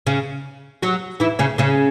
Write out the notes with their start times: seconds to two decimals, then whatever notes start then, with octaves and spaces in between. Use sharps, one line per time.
0.07 C#3 C#4
0.83 F#3 F#4
1.20 E3 E4
1.39 C#3 C#4
1.58 C#3 C#4